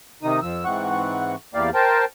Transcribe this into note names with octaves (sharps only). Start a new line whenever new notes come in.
C3 D#3 D#4 D#6
F2 F3 E6
G#2 E3 C4 F#5 C#6
E2 E3 A#3 G4 D5 F5
A#4 C5 G5 A5